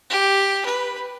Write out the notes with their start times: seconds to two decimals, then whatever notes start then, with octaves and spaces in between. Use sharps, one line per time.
0.10 G4
0.65 B4